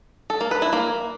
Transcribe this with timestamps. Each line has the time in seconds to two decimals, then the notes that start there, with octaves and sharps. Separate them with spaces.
0.30 A4
0.41 A#3
0.51 B4
0.62 E4
0.73 A#3